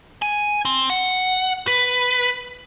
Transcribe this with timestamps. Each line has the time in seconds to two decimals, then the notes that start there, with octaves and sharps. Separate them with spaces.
0.22 G#5
0.65 C4
0.90 F#5
1.67 B4